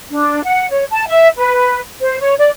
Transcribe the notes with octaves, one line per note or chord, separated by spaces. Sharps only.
D4
F#5
C#5
A5
E5
B4
C5
C#5
D5